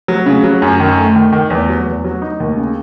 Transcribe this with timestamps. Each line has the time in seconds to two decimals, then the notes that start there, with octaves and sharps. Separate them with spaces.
0.08 F#3
0.26 C#3
0.44 F#3
0.62 F#2
0.80 D#3
0.97 A3
1.16 D#3
1.32 D#3
1.50 E2
1.69 F#3
1.86 E2
2.04 F#3
2.22 D#4
2.40 D#2
2.57 C#3